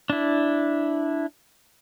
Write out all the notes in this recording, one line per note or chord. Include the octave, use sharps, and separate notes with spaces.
D4 E4